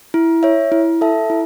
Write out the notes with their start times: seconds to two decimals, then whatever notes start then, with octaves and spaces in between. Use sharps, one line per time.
0.14 E4
0.43 C#5 E5
0.72 E4
1.01 A4 E5 A5
1.30 E4